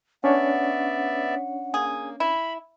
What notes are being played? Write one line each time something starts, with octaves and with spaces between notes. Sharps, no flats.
B3 C#4 D4 C#5 D5 E5 F#5
A#3 G#4
E4 B5